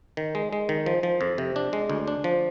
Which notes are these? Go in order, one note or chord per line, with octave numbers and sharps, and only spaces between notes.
D#3
G#3
G#3
D#3
F3
F3
F2
C3
D4
G#3
D2
D4
F3